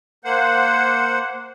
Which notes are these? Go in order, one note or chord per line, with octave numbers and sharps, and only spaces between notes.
A#3 C5 F#5